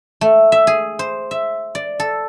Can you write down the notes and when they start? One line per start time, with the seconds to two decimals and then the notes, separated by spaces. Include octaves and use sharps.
0.21 A3
0.52 E5
0.67 G#4
0.99 C5
1.31 E5
1.75 D5
2.00 A4